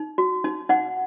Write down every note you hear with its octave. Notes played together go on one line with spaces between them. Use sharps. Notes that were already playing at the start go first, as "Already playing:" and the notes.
Already playing: D#4
F#4
D#4
D#4 F#5